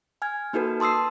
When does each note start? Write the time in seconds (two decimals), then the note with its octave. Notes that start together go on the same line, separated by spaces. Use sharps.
0.22 G#5 F6 G#6
0.53 A#3 D#4 F#4 A4 B4
0.80 A5 C6 D#6 E6 C7